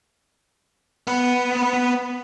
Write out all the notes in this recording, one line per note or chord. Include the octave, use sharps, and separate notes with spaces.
B3 B4